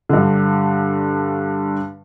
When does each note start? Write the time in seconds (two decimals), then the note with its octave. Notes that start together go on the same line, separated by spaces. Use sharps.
0.09 G2 D3